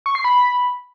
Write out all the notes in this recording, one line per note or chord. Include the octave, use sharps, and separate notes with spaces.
C#6
C7
B5